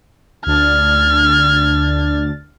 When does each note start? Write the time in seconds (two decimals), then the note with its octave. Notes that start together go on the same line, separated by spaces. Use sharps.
0.46 D2 D4 F6 G#6 A6